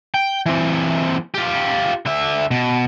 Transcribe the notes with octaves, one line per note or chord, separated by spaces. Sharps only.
G5
E3 C4
F4 G4
D3 E5
B2